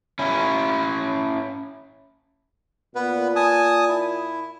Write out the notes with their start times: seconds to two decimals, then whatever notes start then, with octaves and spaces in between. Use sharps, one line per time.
0.19 C#4 E4
2.95 A#2 B3 B4
3.36 G#5 A5 D#6
3.89 E4